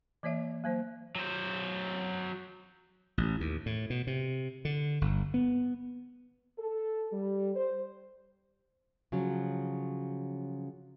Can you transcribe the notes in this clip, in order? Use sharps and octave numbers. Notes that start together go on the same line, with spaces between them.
E3 A#3 C#5 D5 E5
F#3 A#3 C5
F#3 C5
A1
D#2
A2
B2
C3
D3
G1
B3
A4
G3
C5
C#3 F3 F#3